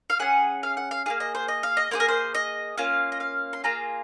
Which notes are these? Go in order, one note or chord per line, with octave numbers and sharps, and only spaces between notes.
F5
C#4 G#4 F#5
F5
F#5
F5
A#3 F4 G#4 F5
D#5
C5
D#5
F5
D#5
A#3 F4 G#4 C5
A#4
C5
D#5
A#3 C#4 F4 F5
D#5
F5
C6
A#3 F4 G#4 A#5